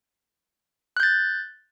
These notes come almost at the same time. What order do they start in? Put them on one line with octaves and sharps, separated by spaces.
F#6 G6 A6